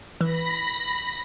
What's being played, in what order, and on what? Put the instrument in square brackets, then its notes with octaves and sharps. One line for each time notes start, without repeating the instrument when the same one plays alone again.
[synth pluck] E3 [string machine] B5 A#6 B6